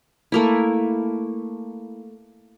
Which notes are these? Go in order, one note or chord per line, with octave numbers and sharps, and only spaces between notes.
A3 A#3 E4